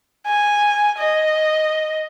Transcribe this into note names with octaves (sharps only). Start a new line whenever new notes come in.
G#5
D#5